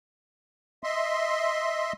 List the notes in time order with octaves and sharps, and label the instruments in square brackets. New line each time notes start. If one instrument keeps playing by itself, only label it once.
[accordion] D#5 E5 C6